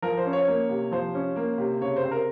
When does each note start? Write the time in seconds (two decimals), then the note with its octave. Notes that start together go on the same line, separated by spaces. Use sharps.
0.02 F3 A#4
0.17 C5
0.26 C#4
0.33 C#5
0.48 A#3
0.69 C3
0.91 F3 C5
1.15 C#4
1.36 A#3
1.58 C3
1.81 C#3 C#5
1.96 C5
2.04 C4
2.11 A#4